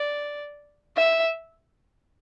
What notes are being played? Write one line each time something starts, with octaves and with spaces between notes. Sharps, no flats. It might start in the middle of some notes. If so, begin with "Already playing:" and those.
Already playing: D5
E5